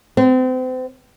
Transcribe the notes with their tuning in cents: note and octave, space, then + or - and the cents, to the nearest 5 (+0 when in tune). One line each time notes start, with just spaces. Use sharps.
C4 -35